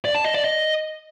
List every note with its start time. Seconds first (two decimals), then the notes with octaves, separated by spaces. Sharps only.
0.05 D5
0.15 A5
0.24 D#5
0.34 D5
0.44 D#5